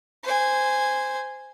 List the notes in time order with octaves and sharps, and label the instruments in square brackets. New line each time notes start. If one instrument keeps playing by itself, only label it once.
[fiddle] C5 G#5